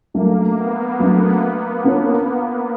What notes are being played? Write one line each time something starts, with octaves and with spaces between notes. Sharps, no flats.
F#3 A3 A#3 D4
B3
F#3 A3 D4
A#3 D4 F4 A#4 C#5